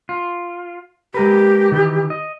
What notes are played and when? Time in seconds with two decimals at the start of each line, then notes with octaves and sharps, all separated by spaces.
0.09 F4
1.14 G#3 G4 A#4 B4
1.72 D#3 E3
2.10 D#5